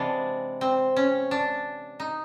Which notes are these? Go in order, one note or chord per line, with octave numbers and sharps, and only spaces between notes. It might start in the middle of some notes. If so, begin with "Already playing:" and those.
Already playing: C3 E3 G#3 D4
C4
C#4
D4
D#4